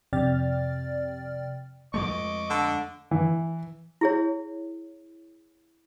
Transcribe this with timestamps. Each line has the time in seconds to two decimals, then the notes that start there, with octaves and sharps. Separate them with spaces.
0.13 F2 C3 D5 G5 F6 A6
1.94 F2 G#3 A3 D#5 C#6 D6
2.50 D3
3.11 E3
4.01 E4 G#4 C#5